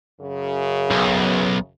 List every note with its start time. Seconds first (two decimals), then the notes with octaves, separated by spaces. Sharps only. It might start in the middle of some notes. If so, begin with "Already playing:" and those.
0.21 F#2 C#3
0.91 B1